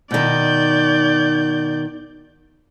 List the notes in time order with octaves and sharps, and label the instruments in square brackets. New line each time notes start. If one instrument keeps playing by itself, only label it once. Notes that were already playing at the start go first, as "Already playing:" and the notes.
[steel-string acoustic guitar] B2 D#3 [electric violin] D5 G6